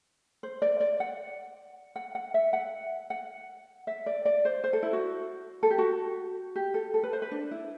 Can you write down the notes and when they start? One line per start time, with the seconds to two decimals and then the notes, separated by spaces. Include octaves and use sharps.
0.43 C5
0.62 D5
0.80 D5
1.00 F#5
1.96 F#5
2.15 F#5
2.34 E5
2.53 F#5
3.10 F#5
3.87 E5
4.06 D5
4.25 D5
4.45 C5
4.64 C5
4.73 A4
4.83 E4
4.93 F#4
5.63 A4
5.70 G4
5.78 F#4
6.56 G4
6.74 A4
6.94 A4
7.03 B4
7.13 C5
7.22 B4
7.31 D4
7.51 E4